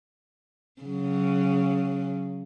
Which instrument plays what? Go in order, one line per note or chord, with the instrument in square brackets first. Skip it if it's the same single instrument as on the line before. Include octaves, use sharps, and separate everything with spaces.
[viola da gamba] C#3 F#3